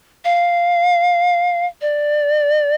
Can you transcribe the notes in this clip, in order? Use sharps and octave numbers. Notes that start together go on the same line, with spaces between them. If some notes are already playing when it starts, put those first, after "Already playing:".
F5
D5